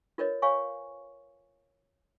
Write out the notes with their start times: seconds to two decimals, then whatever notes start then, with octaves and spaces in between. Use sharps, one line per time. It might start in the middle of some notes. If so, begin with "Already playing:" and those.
0.18 F4 A#4 B4 C#5 D#5
0.42 C5 C#5 F5 G#5 C#6